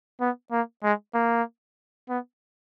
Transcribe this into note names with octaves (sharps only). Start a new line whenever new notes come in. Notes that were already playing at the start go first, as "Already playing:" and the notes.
B3
A#3
G#3
A#3
B3